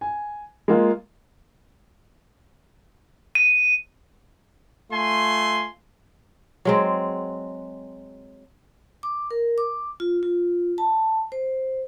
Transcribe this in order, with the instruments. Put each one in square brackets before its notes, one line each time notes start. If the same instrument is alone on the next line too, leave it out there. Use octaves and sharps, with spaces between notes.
[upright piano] G#5
G#3 A#3 F4
[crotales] D#7
[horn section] A3 F4 G#5 C6
[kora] F#3 G#3 C4
[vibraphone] D6
A#4
D6
F4
F4
A5
C5